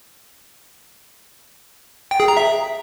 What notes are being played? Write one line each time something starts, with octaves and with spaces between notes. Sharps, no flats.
G5
G#4
A#5
E5